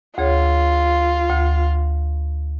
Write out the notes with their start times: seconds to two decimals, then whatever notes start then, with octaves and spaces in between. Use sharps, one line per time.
0.18 D2 F4 G#4 C#5
1.30 D2